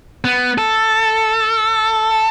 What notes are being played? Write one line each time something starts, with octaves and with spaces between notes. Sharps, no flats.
B3
A4